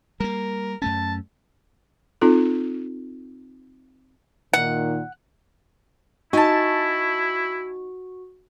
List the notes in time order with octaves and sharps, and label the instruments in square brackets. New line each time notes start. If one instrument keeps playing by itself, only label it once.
[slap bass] G3 A#3 [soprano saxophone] A#4
[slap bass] F#2 A3 C#4 [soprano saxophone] A5
[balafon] C4 D#4 F4 A4
[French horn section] A#2 D#3 [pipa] F#5
[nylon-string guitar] D#4 [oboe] E4 [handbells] F#4 [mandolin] G#5 A5